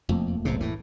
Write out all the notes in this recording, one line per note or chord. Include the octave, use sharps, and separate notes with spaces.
E1 F2 A3 A#3
B1 G#2 C3
A2 E3